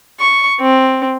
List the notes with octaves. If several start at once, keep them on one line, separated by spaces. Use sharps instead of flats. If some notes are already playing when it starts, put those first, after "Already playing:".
C#6
C4